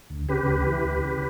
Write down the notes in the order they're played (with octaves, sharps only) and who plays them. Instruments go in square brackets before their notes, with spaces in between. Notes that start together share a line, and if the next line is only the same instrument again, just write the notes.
[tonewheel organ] D2
C#3 G4 B4
D2
E3
D2
C#3